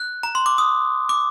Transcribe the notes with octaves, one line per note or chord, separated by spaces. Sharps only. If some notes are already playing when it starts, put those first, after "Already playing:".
Already playing: F#6
A#5
C6
D6
D#6
D6